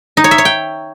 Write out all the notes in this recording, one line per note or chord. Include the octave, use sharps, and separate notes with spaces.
D#4
C#5
E5
C#5
G5